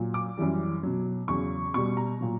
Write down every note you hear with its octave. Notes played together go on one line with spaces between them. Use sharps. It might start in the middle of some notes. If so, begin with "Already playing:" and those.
Already playing: A#2 F#3
D6
F#2 E3 G3
B2 F#3
E2 C#3 F#3 C#6
B2 G3 C#6
A#5
A#2 F#3